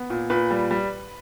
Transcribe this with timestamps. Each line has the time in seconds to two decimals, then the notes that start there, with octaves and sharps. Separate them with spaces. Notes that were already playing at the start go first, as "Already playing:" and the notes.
Already playing: B3
0.10 A#2
0.30 A#2 B4
0.51 G3
0.71 G3